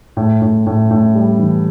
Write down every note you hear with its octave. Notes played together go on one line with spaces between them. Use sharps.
A2
A2
A2
A2
G3
E3